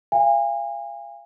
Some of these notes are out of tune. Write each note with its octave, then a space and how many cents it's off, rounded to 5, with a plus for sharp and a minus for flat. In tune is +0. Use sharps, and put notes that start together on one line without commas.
F5 -30 G#5 -35